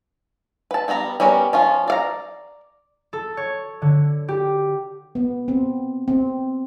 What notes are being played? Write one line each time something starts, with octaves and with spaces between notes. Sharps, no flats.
B4 A5
G3 B3 D#5 A#5 B5
G3 B3 C#4 A#4 B4
F3 C#4 F4
D5 F5 A#5
A4
C#5
D3
G4
B3
C4
C4